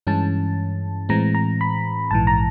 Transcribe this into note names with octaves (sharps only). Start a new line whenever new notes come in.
G2 E3 G#3 C#4 A5
A2 E3 G#3 C4 A#5
A#5
B5
A#1 G#2 E3 A5
A#5